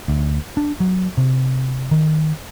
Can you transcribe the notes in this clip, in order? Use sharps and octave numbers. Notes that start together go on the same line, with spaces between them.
D2
D4
F#3
C3
D#3